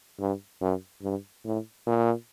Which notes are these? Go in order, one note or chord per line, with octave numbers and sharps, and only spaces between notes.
G2
F#2
G2
A2
A#2